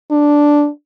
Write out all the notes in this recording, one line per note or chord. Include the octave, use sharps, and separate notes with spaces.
D4